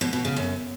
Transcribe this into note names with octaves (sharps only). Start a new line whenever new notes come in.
B2
B2
C#3
F#2